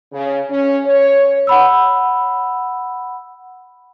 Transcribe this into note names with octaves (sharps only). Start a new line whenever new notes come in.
C#3
C#4
C#5
F#5 B5 E6